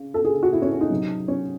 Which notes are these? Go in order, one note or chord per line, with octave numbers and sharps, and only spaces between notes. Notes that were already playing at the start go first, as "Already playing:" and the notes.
Already playing: C#3
A4
G#4
F#4
E4
C#4
C#4
D#4
C3 F#3
C#4